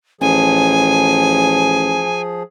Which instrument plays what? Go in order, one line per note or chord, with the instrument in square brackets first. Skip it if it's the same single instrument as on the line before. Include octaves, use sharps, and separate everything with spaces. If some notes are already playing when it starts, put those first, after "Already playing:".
[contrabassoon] A1 [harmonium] F3 G#4 [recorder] G#5